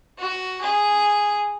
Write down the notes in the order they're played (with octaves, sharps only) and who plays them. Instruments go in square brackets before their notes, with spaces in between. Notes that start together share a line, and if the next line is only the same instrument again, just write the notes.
[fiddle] F#4
G#4